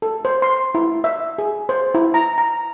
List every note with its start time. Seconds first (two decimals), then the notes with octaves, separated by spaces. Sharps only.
0.02 A4
0.25 C5
0.42 C6
0.75 E4
1.04 E5
1.38 G#4
1.69 C5
1.95 E4
2.14 A#5
2.38 A#5